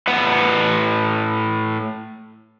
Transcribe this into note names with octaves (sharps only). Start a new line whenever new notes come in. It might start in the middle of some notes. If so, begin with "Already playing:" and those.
A2 B4 F#5